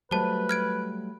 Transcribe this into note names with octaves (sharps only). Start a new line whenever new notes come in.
F#3 G3 A3 B4 C5 A5
F6 G#6 D7